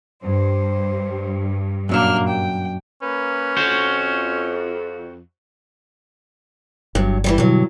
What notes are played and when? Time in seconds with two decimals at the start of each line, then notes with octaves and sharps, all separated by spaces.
0.23 G2 C5
1.89 F#2 A#2 F#3 A#3 D4 F6
2.27 G5
3.02 A#3 C#4 B4
3.57 F2 F#4 C5
6.95 G1 G2 F#3
7.24 E3 F#3 G3
7.38 G2 B2 D3 F#3